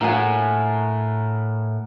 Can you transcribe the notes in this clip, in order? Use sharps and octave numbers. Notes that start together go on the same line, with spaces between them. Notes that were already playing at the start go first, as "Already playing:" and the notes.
A2 A#4 F#5 G#5